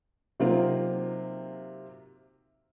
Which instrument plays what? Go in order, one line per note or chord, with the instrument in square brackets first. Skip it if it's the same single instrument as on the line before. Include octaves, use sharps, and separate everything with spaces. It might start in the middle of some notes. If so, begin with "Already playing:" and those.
[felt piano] C3 F#3 A#3 C4 D#4 F4